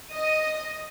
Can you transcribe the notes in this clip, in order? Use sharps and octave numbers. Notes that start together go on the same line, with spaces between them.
D#5 D#6